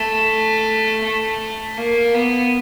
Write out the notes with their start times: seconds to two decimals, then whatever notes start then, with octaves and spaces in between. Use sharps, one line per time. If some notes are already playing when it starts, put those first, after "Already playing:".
Already playing: A3
1.04 A3
1.78 A#3
2.15 B3